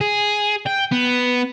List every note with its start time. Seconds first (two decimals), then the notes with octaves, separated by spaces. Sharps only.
0.01 G#4
0.66 G5
0.91 B3